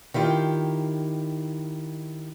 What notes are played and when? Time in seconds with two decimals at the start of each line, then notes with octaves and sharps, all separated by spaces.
0.14 D#3 E4 F4 G4